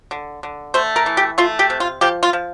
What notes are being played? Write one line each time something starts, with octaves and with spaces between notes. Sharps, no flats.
D3
D3
A3 C5
A#4
E3
G4
A3 F4
G4
C3
F4
F3 G4
F4
F3